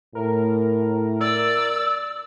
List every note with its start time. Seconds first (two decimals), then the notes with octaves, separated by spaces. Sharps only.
0.15 A2 A#4
1.21 D5 E6